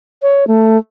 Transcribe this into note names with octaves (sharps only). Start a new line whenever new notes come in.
C#5
A3